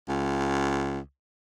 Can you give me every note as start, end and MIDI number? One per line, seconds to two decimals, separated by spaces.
0.08 0.99 37